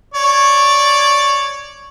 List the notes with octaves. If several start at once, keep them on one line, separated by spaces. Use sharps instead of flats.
C#5 D5